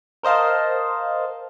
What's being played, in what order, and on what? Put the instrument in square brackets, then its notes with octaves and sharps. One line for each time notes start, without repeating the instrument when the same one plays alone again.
[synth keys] A#4 C5 D#5 F5 A5